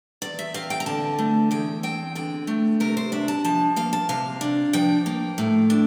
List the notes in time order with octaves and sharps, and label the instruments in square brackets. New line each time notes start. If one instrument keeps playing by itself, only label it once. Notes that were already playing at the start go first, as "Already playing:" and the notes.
[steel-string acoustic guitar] E2 D5
E5
C4 F5
G5
A#5
D3 A5
A3
E2 G5
C4 G5
D3 G5
A3
C3 A#4
C5
D4 E5
A5
F3 A5
A#3 F5
A5
C3 F5
D4
F3 G5
A#3
A2
D4